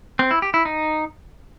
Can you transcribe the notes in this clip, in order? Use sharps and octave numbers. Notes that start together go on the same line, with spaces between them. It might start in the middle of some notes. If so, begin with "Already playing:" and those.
C4
E4
G4
E4
D#4